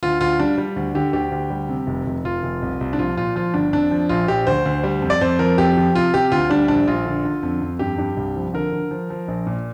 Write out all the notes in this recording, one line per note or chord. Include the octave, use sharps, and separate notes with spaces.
D2 F4
D2 F4
G3 D4
G3
D2
D3 G4
D2 G4
D2
G3
C3
F1
F1
F1 F4
F1
C2
C2
D4
F3 F4
A#2 F4
F3 F4
G1 D4
F2 D4
F3
A#1 F4
A#1 G4
D2 C5
D2
G3
F2
D5
F2 C5
F3 A#4
F2 G4
F3
C3 F4
C3 G4
D2 F4
G3 D4
A#1 D4
A#1 F4
D3
D3
F2
F2
G2 G4
G2
C2
F3
D3 A#4
D3
F3
F3
A#1
A#2